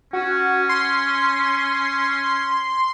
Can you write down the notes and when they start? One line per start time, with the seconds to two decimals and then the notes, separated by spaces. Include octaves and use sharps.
0.13 C#4 F#4
0.69 C6